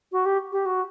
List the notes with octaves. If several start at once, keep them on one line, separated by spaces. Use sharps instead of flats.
F#4
G4
G4
F#4